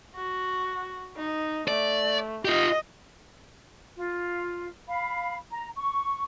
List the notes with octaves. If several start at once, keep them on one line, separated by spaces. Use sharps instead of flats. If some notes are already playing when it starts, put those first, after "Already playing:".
F#4
D#4
A3 D5
F4 G4 D#5
F4
F5 B5
A#5
C#6